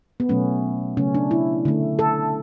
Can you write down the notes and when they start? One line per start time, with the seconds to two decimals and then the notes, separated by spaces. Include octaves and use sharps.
0.20 B3
0.29 B2 F#3 A3 C#4
0.97 C#3 F#3 A3 C#4
1.15 D4
1.31 E4
1.65 D3 A3
1.99 A4